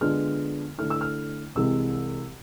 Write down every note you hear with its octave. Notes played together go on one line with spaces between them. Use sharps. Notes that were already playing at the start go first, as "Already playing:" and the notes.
D3 G#3 B3 D4 F4 F6
D3 A3 E4 F6
E6
F6
C2 C3 E3 G#3 E6